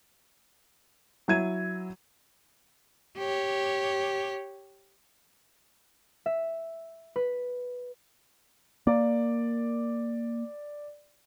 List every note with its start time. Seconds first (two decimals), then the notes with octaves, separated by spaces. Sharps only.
1.28 F#3 E4 G#6 D#7
3.18 G4 C#5
6.26 E5
7.16 B4
8.87 A#3 D5